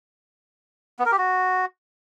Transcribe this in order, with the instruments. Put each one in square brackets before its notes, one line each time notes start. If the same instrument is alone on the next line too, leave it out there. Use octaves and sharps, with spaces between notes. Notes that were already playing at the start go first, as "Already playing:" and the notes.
[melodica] B3
A#4
G4
F#4